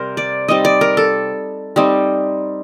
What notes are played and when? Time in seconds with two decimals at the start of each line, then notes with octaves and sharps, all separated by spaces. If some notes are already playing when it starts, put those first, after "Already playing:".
Already playing: C3 G3 A#4 C5
0.17 D5
0.48 G3 C4 D#4 D#5
0.65 D5
0.81 A#4
0.97 A4
1.76 G3 C4 D#4